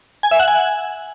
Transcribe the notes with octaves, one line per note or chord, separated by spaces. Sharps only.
G#5
E5
F#5
G#5